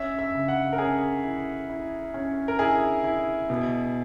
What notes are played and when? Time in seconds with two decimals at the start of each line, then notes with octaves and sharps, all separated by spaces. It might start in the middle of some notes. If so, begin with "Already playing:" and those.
Already playing: C#4 E5
0.19 E5
0.34 C#3
0.48 F#5
0.73 A#4
0.78 C#4 G#4
1.24 E4
1.70 E4
2.14 C#4
2.48 A#4
2.59 E4 G#4
3.04 E4
3.50 B2